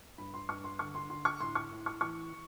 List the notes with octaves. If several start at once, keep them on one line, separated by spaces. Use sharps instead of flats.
G2 B5
C6
G2 C#6
C6
D3 C#6
C6
D3 C6
C#6
A2 C6
C#6
A2
C#6
E3 C#6
E3